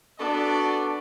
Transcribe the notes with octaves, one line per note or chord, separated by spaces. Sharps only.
B3 D4 F#4 A4 D5